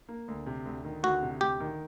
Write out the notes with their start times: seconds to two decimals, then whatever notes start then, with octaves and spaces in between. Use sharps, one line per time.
0.09 A#3
0.28 D2
0.46 C3
0.65 D2
0.85 D#3
1.03 D2 F#4
1.23 C3
1.41 D2 G4
1.60 D#3